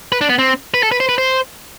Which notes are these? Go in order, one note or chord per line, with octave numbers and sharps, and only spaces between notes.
B4
D4
B3
C4
B4
A4
B4
C5
B4
C5